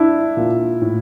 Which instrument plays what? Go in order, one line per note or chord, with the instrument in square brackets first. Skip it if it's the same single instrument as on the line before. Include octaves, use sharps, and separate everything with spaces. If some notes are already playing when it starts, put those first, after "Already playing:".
Already playing: [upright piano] D4 [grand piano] E4
[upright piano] A#2
A2